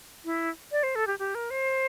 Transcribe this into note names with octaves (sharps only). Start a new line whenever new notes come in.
E4
D5
C5
A4
G4
G4
A#4
C5